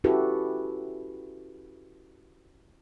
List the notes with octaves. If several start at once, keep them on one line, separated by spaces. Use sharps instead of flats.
C#4 E4 F#4 G4 A4 B4